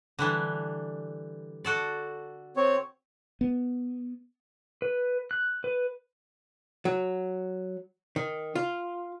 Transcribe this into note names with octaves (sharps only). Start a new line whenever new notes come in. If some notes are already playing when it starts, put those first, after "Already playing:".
D3 E3 G3
F#4 A4 D5
C4 C#5
B3
B4
F#6
B4
F#3
D#3
F4